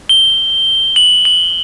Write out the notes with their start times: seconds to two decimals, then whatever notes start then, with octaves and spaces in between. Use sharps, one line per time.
0.09 G7
0.96 F#7
1.25 F#7